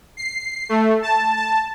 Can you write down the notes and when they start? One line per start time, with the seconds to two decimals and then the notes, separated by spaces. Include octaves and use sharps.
0.17 C7
0.69 A3
1.02 A5
1.37 A5